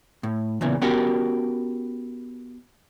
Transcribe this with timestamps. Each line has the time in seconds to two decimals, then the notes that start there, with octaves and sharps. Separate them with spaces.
0.23 A2
0.61 E2 A#2 C#3 E3
0.81 B3 C#4 F#4 G4 A#4 F#5